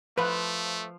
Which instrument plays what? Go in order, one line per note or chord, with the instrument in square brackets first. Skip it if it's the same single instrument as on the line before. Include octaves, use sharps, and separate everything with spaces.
[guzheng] F3 [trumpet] A3 [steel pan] B4